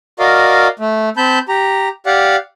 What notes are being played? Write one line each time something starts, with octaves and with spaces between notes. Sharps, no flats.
F#4 A#4 D5 D#5 F5
A3
C4 A5 B5 G6
G4 A#5
G4 D5 F5 F#5